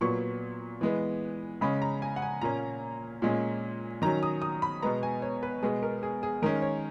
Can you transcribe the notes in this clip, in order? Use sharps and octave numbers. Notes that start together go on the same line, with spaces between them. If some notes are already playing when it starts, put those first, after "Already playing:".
A#2 F#3 B3 C#6
E3 G#3 B3
C#3 G#3 C#4 B5
A#5
G#5
F#5
G#5
A#2 A#3 C#4 A#5
A#2 G#3 C#4
D#3 F#3 C#4 A#5
D#6
D#6
B5
B2 G#3 B3 A#5
G#5
C#5
B4
B2 G#3 B3 G#4
A#4
G#4
G#4
D#3 G#3 C#4 A#4
C#5